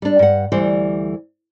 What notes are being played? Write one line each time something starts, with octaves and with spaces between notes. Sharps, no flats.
G3 D4
G2 F#5
D2 E3 G3 C5